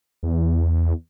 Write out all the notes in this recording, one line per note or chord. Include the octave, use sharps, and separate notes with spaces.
E2